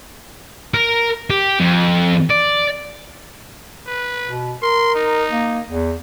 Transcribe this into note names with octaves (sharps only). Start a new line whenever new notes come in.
A#4
G4
F2
D5
B4
B2
A#4 C6
D#4
A#3
E2